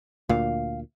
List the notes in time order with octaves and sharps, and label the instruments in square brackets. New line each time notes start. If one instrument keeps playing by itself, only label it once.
[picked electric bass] D2 A#2 [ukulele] F5